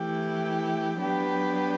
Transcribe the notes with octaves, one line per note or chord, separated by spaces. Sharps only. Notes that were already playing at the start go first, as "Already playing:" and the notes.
Already playing: E3 A3 E4 G4
F#3 B3 D4 G4 B4